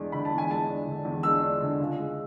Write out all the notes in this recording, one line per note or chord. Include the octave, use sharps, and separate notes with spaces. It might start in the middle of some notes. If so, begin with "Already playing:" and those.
Already playing: E2 G#3 D4
D3 B5
A5
E2
G#5
G#3 A5
D4
D3
E2
G#3 E6
D4
D3
C#2
G#3